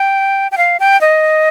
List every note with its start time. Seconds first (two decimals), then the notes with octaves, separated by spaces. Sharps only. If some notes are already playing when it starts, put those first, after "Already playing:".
Already playing: G5
0.52 G5
0.58 F5
0.80 G5
1.01 D#5